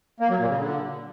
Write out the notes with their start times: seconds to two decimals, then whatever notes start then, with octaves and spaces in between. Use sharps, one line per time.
0.20 A#3
0.30 F#3
0.39 A#2
0.48 C#3
0.58 D3